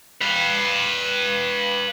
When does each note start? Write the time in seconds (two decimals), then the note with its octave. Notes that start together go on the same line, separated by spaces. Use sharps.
0.21 B4 F5